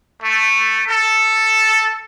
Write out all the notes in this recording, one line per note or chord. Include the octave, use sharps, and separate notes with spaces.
A3
A4